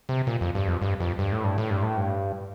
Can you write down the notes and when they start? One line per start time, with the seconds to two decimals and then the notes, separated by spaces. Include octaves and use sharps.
0.09 C3
0.27 A#2
0.41 F2
0.55 G2
0.68 F2
0.82 G2
1.00 F2
1.19 G2
1.32 A2
1.44 G2
1.58 A2
1.70 G2
1.83 A2
1.97 G2